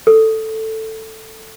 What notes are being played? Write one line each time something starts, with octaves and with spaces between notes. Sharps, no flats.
A4